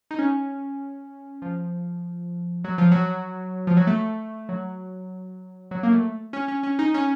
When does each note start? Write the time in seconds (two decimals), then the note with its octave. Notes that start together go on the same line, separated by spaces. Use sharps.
0.11 D#4
0.19 C#4
1.42 F3
2.64 F#3
2.78 F3
2.91 F#3
3.67 F3
3.77 F#3
3.87 A3
4.49 F#3
5.71 F#3
5.83 A#3
5.92 A3
6.33 C#4
6.48 C#4
6.63 C#4
6.79 D#4
6.94 C#4